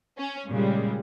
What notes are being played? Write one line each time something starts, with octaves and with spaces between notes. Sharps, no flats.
C#4
A#2 C#3 G3 G#3